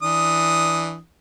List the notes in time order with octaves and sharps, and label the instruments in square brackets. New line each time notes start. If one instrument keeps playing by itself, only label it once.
[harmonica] E3 D4 D#6